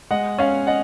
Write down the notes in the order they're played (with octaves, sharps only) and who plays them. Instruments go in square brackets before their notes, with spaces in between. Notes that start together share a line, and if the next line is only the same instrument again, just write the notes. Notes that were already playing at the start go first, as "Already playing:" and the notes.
[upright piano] G#3 D#5 F#5
C#4 C#5 F5
D#5 F#5